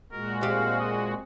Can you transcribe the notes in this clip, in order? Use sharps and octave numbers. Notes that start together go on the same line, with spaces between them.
A#2 G#3 F#4 A#4
C4 G4 F5
D#5